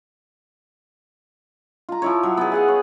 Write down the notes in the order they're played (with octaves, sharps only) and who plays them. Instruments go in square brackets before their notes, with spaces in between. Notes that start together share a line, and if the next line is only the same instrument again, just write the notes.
[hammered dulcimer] F4 A#5
F3 E4 C#5
F#3
B3 G#4
F5 F#5 G#5
C#5